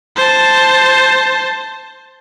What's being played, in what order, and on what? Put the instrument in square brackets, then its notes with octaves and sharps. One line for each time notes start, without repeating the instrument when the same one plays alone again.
[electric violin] C5 A5